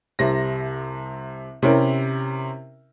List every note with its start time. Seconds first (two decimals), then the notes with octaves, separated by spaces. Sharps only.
0.19 C2 C3 A#6
1.62 C3 C#4 E4 G4 A#4